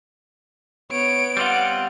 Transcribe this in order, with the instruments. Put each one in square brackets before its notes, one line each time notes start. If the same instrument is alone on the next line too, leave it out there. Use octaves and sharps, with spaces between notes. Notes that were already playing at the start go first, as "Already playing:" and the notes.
[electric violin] B3 D7 [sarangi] C#5
[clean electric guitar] G3 C4 F4 [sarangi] F#5